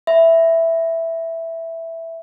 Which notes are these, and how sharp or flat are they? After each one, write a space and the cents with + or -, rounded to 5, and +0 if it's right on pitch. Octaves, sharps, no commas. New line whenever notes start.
E5 +0 B5 +15